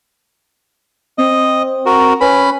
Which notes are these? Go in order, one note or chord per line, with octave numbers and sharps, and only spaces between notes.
C4 D#5
F#4 A#4
C#4 B4 B5